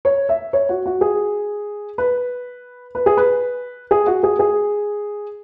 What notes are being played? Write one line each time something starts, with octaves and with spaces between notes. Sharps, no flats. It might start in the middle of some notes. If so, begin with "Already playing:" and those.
C#5
E5
C#5
F#4
F#4
G#4
B4
B4
G#4
B4
G#4
F#4
G#4
G#4